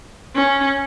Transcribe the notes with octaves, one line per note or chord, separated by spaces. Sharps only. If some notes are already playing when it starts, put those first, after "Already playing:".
C#4